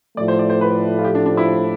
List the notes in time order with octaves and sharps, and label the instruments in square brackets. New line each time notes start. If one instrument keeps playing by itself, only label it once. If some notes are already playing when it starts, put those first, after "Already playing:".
[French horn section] A2 F3 A3 [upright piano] D5
[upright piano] C5
D5
C5
B4
F4
G4
D4
D4
E4